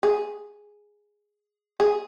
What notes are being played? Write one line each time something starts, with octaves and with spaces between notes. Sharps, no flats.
G#4
G#4